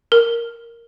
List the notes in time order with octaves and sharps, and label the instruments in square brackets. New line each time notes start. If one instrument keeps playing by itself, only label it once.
[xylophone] A#4